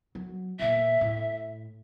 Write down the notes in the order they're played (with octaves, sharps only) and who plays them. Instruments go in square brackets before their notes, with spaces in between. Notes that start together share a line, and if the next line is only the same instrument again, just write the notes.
[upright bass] F#3
[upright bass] E2 A#2 [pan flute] E5
[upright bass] A2